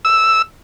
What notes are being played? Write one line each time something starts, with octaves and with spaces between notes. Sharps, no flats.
E6